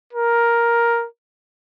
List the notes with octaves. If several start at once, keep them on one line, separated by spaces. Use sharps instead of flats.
A#4